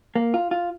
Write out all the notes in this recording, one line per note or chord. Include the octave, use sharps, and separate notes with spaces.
A#3
F4
F4